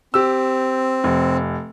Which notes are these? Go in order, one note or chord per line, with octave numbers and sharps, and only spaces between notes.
C4 G4 E6
F1